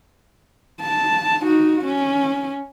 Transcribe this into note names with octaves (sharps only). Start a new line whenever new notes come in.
A5
D#4 F#4
C#4